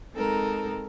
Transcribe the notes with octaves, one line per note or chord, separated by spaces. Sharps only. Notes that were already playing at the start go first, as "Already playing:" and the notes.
G#3 C4 D#4 A4 A#4